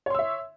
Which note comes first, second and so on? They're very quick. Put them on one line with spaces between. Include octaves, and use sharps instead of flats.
C#5 C6 E6 E5